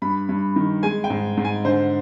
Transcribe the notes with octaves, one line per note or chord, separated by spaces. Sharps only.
G2 B5
G2
D#3
G#3 G#5
G5
G#2
G#2
G#5
D3 C5